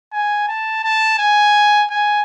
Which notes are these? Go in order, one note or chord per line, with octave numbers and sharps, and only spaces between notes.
G#5
A5
A5
G#5
G#5